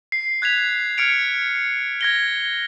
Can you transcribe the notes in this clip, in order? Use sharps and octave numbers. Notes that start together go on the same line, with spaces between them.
C7
F#6 G#6 B6 F7
F6 G#6 C#7 D7 F7
G#6 A#6 G7